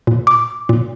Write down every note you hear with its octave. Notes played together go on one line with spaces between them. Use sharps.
A#2
D6
A#2